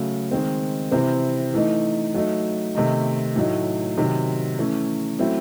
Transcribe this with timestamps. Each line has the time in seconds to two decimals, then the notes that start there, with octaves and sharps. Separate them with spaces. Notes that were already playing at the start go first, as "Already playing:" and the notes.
Already playing: C#3 F#3 A3
0.31 D#3 G#3 C4
0.92 C3 E3 C4 E4
1.53 E3 A3 D#4
2.14 F#3 A3 D#4
2.75 C3 D#3 A3 D#4
3.36 A2 F#3 A3 D#4
3.98 C3 D#3 F#3
4.58 E3 A3 C#4
5.19 F#3 A3 C4 E4